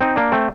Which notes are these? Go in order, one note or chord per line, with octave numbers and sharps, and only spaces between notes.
C4 D#4
A#3 D4
A3 C4